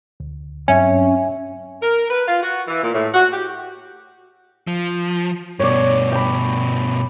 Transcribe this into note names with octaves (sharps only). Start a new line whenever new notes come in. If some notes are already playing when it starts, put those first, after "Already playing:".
D2
G2 F#3 C4 C#4 E5 G#5
A#4
B4
F4
F#4
E3
A#2
A2
F#4
G4
F3
G2 B2 C#5 D5
G5 B5